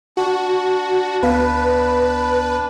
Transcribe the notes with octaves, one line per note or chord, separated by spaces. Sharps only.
D4 F#4
D2 B3 B4 F5